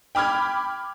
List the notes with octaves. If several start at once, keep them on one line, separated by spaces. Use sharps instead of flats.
G5 B5 D6 F6 G#6